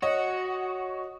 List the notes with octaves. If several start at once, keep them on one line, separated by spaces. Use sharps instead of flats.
F#4 C#5 D#5